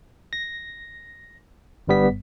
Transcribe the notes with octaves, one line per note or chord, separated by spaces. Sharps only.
A#6
G1 G2 G3 B3 B6